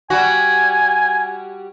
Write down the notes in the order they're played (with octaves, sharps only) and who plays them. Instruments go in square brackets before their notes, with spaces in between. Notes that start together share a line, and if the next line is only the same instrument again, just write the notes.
[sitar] G3 F#4 [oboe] G#5